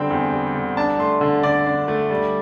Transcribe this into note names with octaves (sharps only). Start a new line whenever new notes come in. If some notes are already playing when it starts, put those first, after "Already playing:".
Already playing: D3 G3 C4 G5
E2
G3
D3
D4 A5
A3 C6
D3
D3 D5
D4
A3
G3